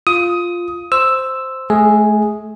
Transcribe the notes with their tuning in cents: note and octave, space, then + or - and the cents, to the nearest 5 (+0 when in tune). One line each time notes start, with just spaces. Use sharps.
F4 +0 D#6 +15
C5 +0 E6 +0
A3 -40 G#4 +0